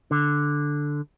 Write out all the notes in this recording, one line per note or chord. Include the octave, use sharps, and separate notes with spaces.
D3